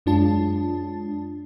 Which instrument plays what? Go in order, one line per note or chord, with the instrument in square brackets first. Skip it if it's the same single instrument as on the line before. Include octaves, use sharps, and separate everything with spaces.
[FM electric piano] F#2 G#3 D4 F4 A5